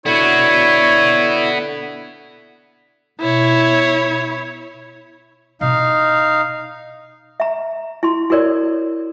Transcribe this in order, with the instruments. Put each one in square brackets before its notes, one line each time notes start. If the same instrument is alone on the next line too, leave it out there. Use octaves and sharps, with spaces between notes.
[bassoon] D3 [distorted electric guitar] B3 F#4 [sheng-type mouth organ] E4 [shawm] C#5
[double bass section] B2 [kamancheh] E4 C#5
[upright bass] B2 E4 [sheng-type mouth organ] D#4 F5
[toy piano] E5 A#5
E4 C6
E4 F#4 A4 A#4 C#5 D5